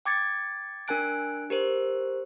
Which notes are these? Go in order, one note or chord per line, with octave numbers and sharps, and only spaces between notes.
G5 D6 G#6 A6 C#7
D4 A#4 G5 G#5 F#6 D7
G4 A#4 C5